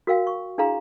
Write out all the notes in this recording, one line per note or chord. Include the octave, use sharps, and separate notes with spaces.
F#4 A#4 F5 G5
C#6
D4 E4 G#4 F5 A#5 C6